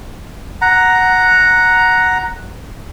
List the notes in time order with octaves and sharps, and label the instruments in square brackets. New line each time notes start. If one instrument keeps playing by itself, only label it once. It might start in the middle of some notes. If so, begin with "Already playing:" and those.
[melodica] F#5 A#5